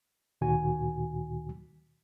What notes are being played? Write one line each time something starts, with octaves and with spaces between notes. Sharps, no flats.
D2 A#2 D#3 F#4 G#5